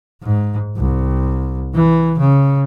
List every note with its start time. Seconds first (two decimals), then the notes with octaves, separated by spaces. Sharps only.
0.23 G#2
0.77 C2
1.75 E3
2.19 C#3